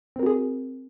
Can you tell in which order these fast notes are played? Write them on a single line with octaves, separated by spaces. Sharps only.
C4 A#4 F#4 G#4